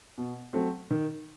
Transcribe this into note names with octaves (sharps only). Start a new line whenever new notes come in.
B2
F#3 A3 C4
D#3